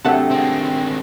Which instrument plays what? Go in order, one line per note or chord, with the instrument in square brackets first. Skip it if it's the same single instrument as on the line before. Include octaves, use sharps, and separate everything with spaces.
[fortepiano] C3 F#3 A3 [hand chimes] D4 G5 [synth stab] E5 F#5 A5
[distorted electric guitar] G#3 C4